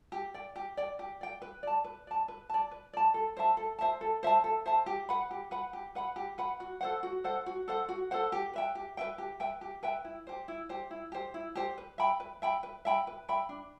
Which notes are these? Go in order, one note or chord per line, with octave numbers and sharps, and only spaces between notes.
G4
D5 G5
G4
D5 G5
G4
D5 G5
B4
D5 A5
B4
D5 A5
B4
D5 A5
B4
D5 A5
A4
C5 E5 A5
A4
C5 E5 A5
A4
C5 E5 A5
A4
C5 E5 A5
G4
B4 F#5 B5
G4
B4 F#5 B5
G4
B4 F#5 B5
G4
B4 F#5 B5
F#4
A4 C5 F#5
F#4
A4 C5 F#5
F#4
A4 C5 F#5
F#4
A4 C5 F#5
G4
B4 E5 G5
G4
B4 E5 G5
G4
B4 E5 G5
G4
B4 E5 G5
E4
G4 C5
E4
G4 C5
E4
G4 C5
E4
G4 C5
B4
E5 G5 B5
B4
E5 G5 B5
B4
E5 G5 B5
B4
E5 G5 B5
D4